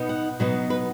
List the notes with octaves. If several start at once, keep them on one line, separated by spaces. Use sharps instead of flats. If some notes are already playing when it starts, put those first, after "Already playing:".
Already playing: B2 B3 D#4
F#5
B2 F#3 B3 D#4
B4